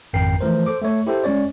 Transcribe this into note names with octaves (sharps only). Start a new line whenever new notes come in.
G#1 F2 A#4 G5 C7
E3 F3 A3 A#4 C5
A4 C5 D6
A3 C#5
E4 G4 A4 C5
G#3 C#4 C#5 D5